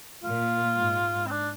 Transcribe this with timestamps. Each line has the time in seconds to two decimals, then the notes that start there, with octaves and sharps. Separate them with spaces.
0.24 A#2 F4
0.78 G#2
1.27 C4
1.31 D4